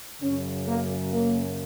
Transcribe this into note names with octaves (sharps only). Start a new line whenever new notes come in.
F#2 C#3 C#4
A#3
A#3